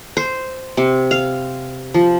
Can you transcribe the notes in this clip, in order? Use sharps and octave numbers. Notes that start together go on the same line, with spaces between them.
C5
C3
F5
F3